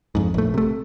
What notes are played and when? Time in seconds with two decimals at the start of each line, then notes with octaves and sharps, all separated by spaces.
0.15 F2 G#2
0.34 A#1 A3
0.54 C3 A3